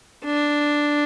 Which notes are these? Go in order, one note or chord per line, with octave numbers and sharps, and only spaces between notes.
D4